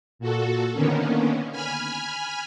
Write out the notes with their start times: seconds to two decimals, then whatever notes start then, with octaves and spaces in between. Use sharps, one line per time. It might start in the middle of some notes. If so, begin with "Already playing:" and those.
0.19 A#2 F#4 A4
0.74 D3 D#3 A#3 B3 C#4
1.52 G#5 B5 F6